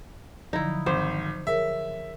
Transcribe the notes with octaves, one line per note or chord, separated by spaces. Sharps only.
D3 F3 F#3 D#4 E4
G#1 C5
G#4 A#4 C#5 E5